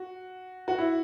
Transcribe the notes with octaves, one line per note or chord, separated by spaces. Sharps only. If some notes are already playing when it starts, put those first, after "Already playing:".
Already playing: F#4
F#4
E4